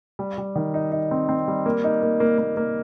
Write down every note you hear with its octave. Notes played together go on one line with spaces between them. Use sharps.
G3
G3
D#3
D#4
D#4
C4
C4
G3
A#3
D#4
A#3
A#3
A#3
A#3